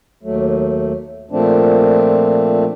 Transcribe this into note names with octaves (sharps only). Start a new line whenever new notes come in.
D#2 F#3 A3
A#2 F3 A3 C4 D4